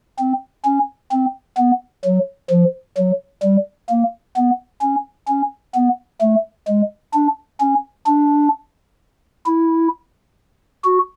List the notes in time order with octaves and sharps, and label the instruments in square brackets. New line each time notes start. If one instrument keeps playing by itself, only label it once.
[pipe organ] C4
C#4
C4
B3
F#3
F3
F#3
G3
A#3
B3
C#4
C#4
B3
A3
G#3
D4
C#4
D4
E4
F#4